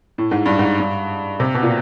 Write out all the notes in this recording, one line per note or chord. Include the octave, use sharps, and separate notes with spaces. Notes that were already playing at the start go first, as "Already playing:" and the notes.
A2
G#2
G2
G#2
G2
C3
B2
A#2